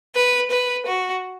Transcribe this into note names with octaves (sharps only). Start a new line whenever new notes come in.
B4
B4
F#4